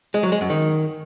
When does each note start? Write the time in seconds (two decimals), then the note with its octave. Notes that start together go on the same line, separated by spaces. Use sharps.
0.14 G#3
0.23 F#3
0.32 G#3
0.41 F#2
0.50 D#3